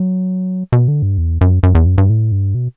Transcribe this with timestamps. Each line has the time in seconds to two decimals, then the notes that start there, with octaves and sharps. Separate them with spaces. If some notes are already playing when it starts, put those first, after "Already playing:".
Already playing: F#3
0.72 B2
0.88 D3
1.02 G2
1.18 E2
1.41 F#2
1.63 F#2
1.75 E2
1.86 F#2
1.98 G2
2.10 A2
2.32 G2
2.55 B2